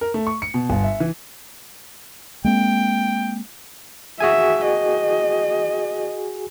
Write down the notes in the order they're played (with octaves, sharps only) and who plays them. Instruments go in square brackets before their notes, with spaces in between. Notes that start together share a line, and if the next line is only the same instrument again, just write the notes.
[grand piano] A#4
A3
C#6
C#7
B2
G1
E5
E3
[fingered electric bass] G#3 A#3 C4 [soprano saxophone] G5
[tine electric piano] F#4 G#4 G#5 [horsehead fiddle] E5
[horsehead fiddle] D#5